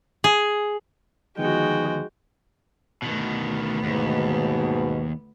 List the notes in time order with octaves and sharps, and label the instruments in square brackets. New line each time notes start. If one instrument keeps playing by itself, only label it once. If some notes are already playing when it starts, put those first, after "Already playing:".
[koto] G#4
[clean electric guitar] D2 D#3 B3 [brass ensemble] F3 D#4 [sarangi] G#3 [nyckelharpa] F#4 G5
[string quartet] D2 B3 [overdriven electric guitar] B2 D#3
[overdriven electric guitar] D#2 [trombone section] G#2 B2